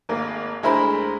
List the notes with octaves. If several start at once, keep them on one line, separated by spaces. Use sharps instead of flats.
G#1 A#3
D2 G#3 E4 A#4 C5 B5